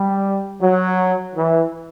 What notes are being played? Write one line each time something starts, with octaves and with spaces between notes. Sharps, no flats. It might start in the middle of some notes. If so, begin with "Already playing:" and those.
Already playing: G3
F#3
E3